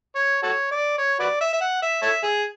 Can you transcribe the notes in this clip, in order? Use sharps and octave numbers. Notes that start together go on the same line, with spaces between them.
C#5
F#4 A4 C#5
D5
C#5
F#4 B4 D5
E5
E5
F#5
E5
A4 C#5 E5
G#4